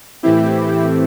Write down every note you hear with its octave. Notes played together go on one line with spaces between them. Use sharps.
A2 E3 A3 C4 E4 G4